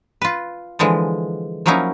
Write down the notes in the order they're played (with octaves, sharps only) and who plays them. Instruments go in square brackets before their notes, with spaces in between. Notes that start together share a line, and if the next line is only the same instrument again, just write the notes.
[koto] F4 B4
D3 E3 F3 G#3
F3 F#3 A#3 C#4 D#4 E4